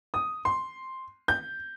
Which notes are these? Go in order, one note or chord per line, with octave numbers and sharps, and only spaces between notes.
D#6
C6
G6